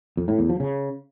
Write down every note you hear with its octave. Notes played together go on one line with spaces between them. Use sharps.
F2
A2
E2
F3
C#3